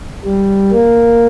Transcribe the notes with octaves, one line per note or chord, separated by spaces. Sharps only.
G3
A#3